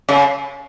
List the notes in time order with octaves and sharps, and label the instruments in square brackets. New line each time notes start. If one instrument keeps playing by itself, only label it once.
[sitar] C#3